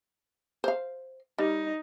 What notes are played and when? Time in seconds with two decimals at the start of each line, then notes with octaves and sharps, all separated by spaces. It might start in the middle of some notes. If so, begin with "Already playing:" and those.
0.64 C5 F5
1.38 G3 D#4